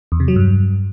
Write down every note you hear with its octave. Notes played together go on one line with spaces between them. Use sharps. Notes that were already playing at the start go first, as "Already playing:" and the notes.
E2
C3
F#3
G2